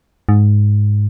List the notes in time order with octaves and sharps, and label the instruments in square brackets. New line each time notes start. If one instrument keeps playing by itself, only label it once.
[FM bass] G#2